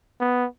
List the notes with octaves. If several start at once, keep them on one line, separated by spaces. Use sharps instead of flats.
B3